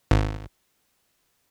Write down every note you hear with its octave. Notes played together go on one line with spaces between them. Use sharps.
G#1